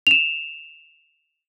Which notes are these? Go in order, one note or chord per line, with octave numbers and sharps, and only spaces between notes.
E7 F7